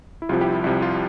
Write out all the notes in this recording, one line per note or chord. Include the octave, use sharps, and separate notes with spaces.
E4
C2 C3 F3 F4
E4 G4
E4
C2 C3 F3 E4
F4